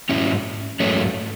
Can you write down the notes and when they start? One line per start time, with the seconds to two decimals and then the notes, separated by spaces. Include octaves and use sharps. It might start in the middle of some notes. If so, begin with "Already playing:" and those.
0.09 G#2 F#3 C#4 E4
0.80 G#2 F#3 A3 C#4